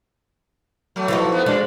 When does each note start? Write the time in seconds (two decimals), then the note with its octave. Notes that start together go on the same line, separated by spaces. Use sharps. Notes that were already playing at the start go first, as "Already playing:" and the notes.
0.96 F#3 A3
1.08 E3 F3 D#4
1.32 A3 B3
1.46 A#2 G#3 D4